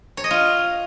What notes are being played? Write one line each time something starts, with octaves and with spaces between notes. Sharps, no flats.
C#5
D#5
F4